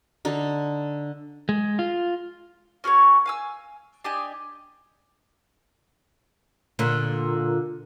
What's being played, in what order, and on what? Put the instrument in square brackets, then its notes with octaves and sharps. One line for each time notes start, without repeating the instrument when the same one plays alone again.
[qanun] D3 D#4
[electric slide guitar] G#3
F4
[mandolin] C#4 F#4 G#4 C#5
F5 G#5 E6
D4 G4 D#5 G#5
[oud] A#2 D3